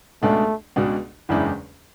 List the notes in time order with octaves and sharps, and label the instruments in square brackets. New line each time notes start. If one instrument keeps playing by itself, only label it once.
[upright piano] C#2 B2 G#3 D4 F#4 [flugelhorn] A3
[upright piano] C#2 B2 G#3 D4 F#4
[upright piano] F#1 E2 C#3 G#3 D4 [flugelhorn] E4